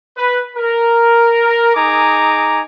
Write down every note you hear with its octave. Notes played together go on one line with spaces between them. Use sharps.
B4
A#4
D#4 G#4 G#5 A#5 D6